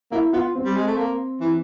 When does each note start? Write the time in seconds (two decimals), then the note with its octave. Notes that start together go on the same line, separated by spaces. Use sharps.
0.11 A#3 E4
0.33 B3 F4
0.55 C4
0.65 G3
0.76 G#3
0.87 A3
0.97 A#3
1.41 E3